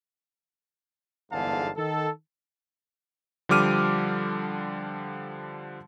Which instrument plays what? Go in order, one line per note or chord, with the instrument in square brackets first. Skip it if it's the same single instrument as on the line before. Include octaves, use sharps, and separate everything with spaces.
[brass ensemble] G1 E2 G#2 D3 F5 A5
D#3 A4
[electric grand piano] D3 F3 G3 D6 F6 D#7